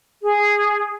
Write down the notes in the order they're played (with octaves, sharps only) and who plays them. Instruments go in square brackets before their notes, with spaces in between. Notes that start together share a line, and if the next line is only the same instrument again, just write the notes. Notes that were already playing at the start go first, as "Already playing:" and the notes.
[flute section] G#4